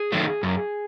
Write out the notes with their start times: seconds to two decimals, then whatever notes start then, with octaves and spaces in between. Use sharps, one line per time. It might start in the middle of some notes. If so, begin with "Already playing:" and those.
Already playing: G#4
0.12 D#3 F#3 A3
0.43 F#2